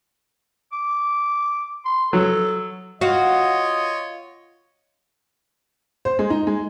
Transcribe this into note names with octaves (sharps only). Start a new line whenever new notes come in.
D6
C6
F#3 A4
F4 F#4 C#5 D#5 F5 F#5
C5
G#3
D#4
G#3